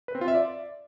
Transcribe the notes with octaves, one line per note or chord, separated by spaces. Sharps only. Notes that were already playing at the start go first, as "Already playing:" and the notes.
B4
C4
F4
E5
D5